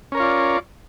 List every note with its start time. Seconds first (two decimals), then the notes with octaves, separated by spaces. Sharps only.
0.12 C#4
0.15 A#4
0.17 C#5
0.20 F4
0.22 D5